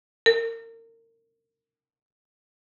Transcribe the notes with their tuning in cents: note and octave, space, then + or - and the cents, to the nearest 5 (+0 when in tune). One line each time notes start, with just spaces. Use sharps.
A#4 -35